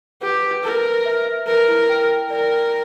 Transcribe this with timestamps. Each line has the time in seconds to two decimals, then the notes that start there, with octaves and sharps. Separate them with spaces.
0.21 G4 B4
0.43 B4
0.63 A#4 B4
0.84 B4
1.05 E5
1.26 E5
1.47 A#4 B4
1.68 E4
1.89 G5
2.10 G5
2.30 A#4 D5
2.51 G5